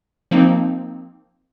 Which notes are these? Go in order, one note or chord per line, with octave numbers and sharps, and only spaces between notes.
F3 A#3 C4 D#4